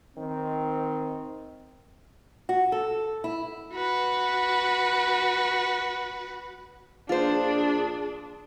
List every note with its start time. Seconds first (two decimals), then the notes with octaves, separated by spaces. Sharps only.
0.17 D#3 C4
2.49 F#4
2.72 A4
3.24 E4
3.73 F#4 B4
7.09 A#1 D4 F4 G#4 C5